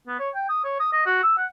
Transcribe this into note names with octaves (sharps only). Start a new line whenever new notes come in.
B3
C#5
G5
D#6
C#5
D#6
D#5
F#4
E6
F#5